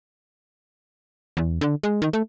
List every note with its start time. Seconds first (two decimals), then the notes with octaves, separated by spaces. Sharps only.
1.37 E2
1.61 D3
1.83 G#3
2.02 D#3
2.13 A3